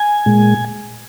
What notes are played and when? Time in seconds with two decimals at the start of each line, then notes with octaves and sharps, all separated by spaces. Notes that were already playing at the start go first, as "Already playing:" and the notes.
Already playing: G#5
0.26 A#2 G#3